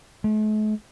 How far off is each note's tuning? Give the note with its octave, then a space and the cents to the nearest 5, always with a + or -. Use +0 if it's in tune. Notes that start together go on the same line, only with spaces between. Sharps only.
A3 -45